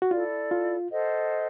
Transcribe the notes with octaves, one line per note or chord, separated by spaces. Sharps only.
F#4
E4 F4 A4 D5
F4
A4 C5 D#5 F#5